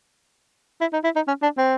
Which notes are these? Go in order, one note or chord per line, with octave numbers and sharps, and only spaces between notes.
E4
D#4
E4
D#4
C#4
D4
C4